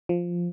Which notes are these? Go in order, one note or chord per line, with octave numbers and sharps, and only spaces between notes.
F3